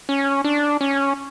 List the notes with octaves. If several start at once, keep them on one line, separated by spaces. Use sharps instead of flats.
C#4
D4
C#4